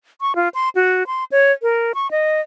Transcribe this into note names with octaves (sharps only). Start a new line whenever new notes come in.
C#6
F4
C6
F#4
C6
C#5
A#4
C#6
D#5